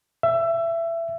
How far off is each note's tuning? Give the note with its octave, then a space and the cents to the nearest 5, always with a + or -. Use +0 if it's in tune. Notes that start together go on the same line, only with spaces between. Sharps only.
E5 +20